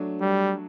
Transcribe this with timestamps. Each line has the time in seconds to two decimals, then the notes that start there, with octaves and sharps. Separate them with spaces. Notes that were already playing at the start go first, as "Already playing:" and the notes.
Already playing: F#3 A3 D4
0.21 G3